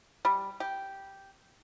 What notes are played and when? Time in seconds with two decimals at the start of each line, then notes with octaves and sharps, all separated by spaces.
0.25 G3
0.60 G4